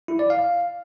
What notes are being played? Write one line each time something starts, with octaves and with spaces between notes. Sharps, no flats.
E4
D5
F5